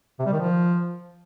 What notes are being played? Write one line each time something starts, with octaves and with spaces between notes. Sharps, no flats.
C3
G3
D#3
F3